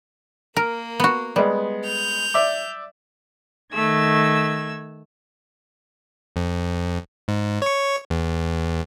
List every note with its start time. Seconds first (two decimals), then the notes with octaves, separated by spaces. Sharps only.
0.56 A#3 A#4
1.00 B3 F#4
1.36 G3 G#3 B3
1.85 G6 F7
2.34 D5 E5 D6
3.73 D#3 A3 E6 G#6
6.36 F2
7.28 G#2
7.62 C#5 C#6
8.10 E2